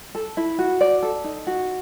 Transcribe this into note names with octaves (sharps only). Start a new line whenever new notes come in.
A4
E4
F#4
D5
A4
D#4
F#4